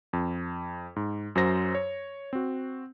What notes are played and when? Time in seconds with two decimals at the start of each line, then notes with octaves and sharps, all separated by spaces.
0.13 F2
0.96 G#2
1.35 F#2 F#3 C5 A#6
1.75 C#5
2.33 C4 F#4